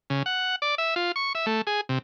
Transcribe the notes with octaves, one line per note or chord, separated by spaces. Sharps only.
C#3
F#5
D5
E5
F4
C#6
E5
A3
G#4
C3